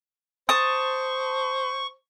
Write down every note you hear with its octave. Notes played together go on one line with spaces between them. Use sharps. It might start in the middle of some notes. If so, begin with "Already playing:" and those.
C5 A5 C#6 D#6